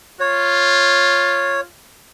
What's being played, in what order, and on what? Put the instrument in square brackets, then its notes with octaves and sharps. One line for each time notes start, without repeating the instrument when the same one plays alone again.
[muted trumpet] F4 [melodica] C#5